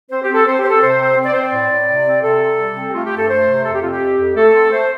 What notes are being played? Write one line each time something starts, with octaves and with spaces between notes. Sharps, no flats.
C4 C5
G4
C4 A4
C4 C5
G4
C4 C5
A4
C3 C5
C4
C4
D5
C4 C5
D5
A2
A2
C3
C4
C3 A4
C3
G3
C4
G4
A3 F4
G4
G2
A4
A3 C5
C3
F2 A4
G4
C4 F4
G4
F2
F2
A3 A4
C4
A3 C5